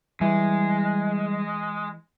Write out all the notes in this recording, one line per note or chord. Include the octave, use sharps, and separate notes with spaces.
E3 G3 G#3 E4